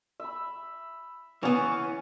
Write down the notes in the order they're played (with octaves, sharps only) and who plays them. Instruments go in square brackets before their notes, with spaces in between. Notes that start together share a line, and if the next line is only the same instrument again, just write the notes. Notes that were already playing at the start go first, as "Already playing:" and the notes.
[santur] E5 B5
[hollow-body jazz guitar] E3 B3 [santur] C#4 F#5 G#5